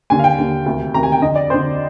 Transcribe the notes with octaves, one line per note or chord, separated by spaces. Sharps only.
D#2 D3 G#5
F5
G5
D#2 D3
D2 C3 D#3
D2 C3 D#3 A#5
G#5
G5
F2 D3 D#5
D5
F2 D3 C5